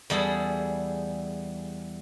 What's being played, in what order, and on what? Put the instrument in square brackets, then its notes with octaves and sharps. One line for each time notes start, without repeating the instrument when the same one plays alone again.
[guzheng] E2 G3 G#4 A4